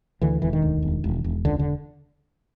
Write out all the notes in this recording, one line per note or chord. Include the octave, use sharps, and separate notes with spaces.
D2 D3 E3
E1 E3
D#3
D2
E1
E1
E1
C#2 D3
D3